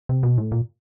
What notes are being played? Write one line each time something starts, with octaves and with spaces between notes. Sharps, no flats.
C3
B2
A2
A#2